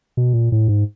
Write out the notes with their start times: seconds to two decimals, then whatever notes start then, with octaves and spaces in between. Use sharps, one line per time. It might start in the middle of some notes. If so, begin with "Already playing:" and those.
0.17 B2
0.33 A#2
0.52 A2
0.68 G#2